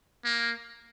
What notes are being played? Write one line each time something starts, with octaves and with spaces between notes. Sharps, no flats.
A#3